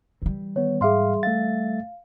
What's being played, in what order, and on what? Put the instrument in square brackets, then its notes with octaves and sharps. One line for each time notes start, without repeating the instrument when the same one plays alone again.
[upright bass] E3 G3
[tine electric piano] D#3 B3 [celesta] C#5
[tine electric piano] G#2 F5 [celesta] G#4 E5 C6
[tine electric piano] A3 E5 A6 [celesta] F5